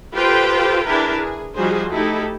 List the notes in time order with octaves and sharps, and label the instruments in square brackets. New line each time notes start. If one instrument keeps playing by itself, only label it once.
[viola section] F4 G4 A4 B4 C5 G5
D4 E4 G#4 A#4 B4
G#4
F3 G3 D#4 F#4 G#4 C5
A3 D#4 E4 G4 A4